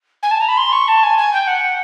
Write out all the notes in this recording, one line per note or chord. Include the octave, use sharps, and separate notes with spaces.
G#5
A5
A#5
B5
C6
C#6
A5
G#5
G#5
G5
F#5